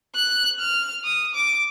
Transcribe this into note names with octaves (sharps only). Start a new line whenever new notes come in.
F#6
F6
D#6
D6